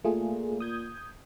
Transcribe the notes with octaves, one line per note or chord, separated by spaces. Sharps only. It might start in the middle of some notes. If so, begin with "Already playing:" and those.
A#2 A3 F4 G#4
D#6 G6 G#6